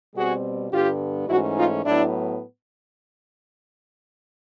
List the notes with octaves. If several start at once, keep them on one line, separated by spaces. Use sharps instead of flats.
B2 G3 C4 F#4 G#4
G2 D3 G3 B3 F4 G4
G#2 E3 A3 C#4 E4 F#4
D#4 F4
A2 F#3 B3 D4 E4